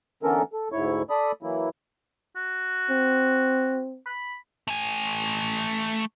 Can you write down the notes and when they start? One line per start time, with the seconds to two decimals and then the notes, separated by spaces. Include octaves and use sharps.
0.23 D3 E3 B3 C#4 A4 A#4
0.53 A4
0.72 D2 G#2 E4 C#5 C#6
1.10 A4 D5 B5 D#6
1.43 E3 F#3 A#3 E4
2.36 F#4
2.90 C4
4.06 B5
4.68 A3 G#5